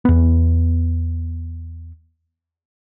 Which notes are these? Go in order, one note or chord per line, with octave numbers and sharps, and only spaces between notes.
E2 B3